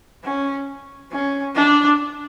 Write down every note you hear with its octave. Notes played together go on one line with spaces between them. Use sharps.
C#4
C#4
D4